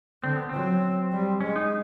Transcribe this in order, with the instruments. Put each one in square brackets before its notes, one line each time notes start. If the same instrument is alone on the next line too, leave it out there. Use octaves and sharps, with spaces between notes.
[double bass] D3 [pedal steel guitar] C4
[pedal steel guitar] B3
[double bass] F#3 [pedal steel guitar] C4
[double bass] G3
[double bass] G#3 [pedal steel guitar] C#4
[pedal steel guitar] D#4